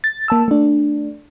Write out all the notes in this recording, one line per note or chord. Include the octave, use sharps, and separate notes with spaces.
A6
A#3 A5 E6
A3 D4